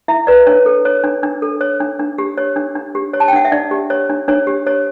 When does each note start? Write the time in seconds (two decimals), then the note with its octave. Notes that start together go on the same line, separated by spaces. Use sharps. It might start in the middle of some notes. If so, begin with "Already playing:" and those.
0.08 E4 E5
0.27 B4 D5
0.47 D4 C#5
0.66 A4
0.85 C#5
1.04 D4
1.23 D4
1.42 A4
1.61 C#5
1.80 D4
1.99 D4
2.18 G4
2.37 C#5
2.56 D4
2.75 D4
2.95 G4
3.14 C#5
3.20 A5
3.28 G5
3.33 D4 F#5
3.45 E5
3.52 D4 D5
3.71 G4
3.90 C#5
4.10 D4
4.28 D4 C#5
4.47 G4
4.66 C#5